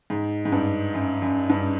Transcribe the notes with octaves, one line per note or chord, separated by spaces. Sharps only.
G#2
G#2
G2
F#2
F#2
G2